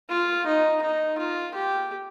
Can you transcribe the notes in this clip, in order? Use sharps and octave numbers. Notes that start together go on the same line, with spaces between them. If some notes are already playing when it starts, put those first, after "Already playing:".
F4
D#4
D#4
F4
G4